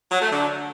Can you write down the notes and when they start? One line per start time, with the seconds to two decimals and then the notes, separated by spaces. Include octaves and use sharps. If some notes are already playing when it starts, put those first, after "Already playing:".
0.11 F#3
0.22 A3
0.32 D3